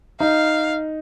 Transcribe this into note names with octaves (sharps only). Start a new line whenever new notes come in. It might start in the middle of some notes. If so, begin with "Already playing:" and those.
D#4 F5